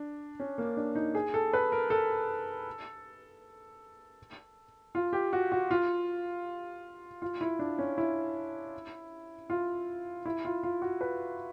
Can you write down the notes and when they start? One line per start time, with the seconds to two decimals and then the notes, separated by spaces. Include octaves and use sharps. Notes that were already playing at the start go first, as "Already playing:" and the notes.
Already playing: D4
0.40 C#4
0.58 A#3
0.77 D4
0.95 D#4
1.15 G#4
1.34 A4
1.53 B4
1.72 A#4
1.90 A4
4.95 F4
5.13 G4
5.33 F#4
5.52 F#4
5.71 F4
7.22 F4
7.41 E4
7.59 D4
7.79 C#4
7.98 E4
9.50 F4
10.25 E4
10.45 F4
10.63 F4
10.82 F#4
11.01 B4